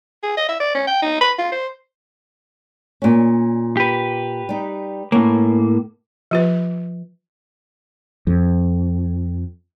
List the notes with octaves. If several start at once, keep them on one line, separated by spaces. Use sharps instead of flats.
G#4
D#5
E5
D5
C#4
G5
D#4
B5
F4
C5
A#2 C#4
G4 B4
G3 D#4
A2 A#3 B3 C#4
F3 F4 B4
F2